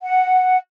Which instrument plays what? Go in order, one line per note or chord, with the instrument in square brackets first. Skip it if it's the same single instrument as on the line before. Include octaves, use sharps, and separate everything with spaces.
[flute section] F#5